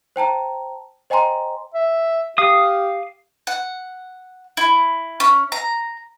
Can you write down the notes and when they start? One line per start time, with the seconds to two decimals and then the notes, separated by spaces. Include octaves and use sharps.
0.16 C5 G5 A5 A#5
1.10 C5 D#5 G5 G#5 A#5 C6
1.74 E5
2.38 G4 F5 D#6
3.47 F#5
4.57 E4
5.20 C#4
5.52 A#5